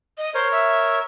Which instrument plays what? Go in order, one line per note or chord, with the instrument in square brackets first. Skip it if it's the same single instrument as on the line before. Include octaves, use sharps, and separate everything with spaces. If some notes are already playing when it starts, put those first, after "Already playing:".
[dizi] D#5
[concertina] A#4 C#5 [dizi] C5
[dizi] E5